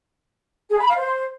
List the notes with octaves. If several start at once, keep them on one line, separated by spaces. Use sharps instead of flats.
G#4
B5
F5
C5